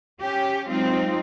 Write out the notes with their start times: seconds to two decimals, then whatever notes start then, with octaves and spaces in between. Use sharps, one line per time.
0.21 C#4 G4
0.68 F#3 G#3 C4 D#4 F4